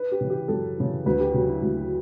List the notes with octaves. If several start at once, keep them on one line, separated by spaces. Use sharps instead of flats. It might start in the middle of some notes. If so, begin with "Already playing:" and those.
Already playing: B4
G4
C#3 E3
G4
F#2 A4
C#3 E3
D2 B4
G4
C#3 F#3
E4
D2